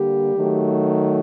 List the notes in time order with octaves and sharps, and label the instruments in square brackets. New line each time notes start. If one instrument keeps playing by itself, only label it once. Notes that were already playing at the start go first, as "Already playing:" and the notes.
Already playing: [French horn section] D3 G3 A#3 G4
D#3 F#3 A3